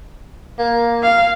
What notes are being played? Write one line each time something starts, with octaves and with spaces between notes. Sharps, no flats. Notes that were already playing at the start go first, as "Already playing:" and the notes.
A#3
F5